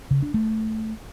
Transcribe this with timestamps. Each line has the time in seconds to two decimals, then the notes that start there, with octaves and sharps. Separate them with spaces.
0.11 C#3
0.22 D4
0.34 A3